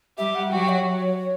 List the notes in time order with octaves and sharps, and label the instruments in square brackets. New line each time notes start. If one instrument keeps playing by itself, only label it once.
[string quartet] G3 G4 [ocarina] E5
[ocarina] F#5
[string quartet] F#3 F#4 [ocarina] G5
[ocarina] C#5